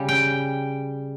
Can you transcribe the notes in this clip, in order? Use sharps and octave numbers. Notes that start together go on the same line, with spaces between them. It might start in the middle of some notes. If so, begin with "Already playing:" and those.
Already playing: C#3 G3
G5